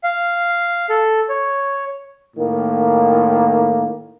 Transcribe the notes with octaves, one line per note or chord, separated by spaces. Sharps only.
F5
A4
C#5
A2 D#3 A#3